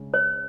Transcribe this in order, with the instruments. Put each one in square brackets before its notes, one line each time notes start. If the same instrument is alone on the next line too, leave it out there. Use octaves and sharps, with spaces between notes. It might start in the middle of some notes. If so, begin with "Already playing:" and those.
Already playing: [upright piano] C#3 G#3
[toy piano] C#5